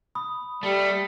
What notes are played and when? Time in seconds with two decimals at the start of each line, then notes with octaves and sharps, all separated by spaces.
0.15 B5 D#6
0.63 G3 A3